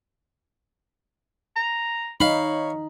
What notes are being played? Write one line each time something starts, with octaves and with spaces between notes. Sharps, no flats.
A#5
D#4 C#5 F5 B5